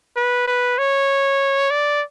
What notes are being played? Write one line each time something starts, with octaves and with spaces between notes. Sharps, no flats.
B4
B4
C#5
D5